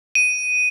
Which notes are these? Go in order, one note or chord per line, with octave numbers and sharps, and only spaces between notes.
D#7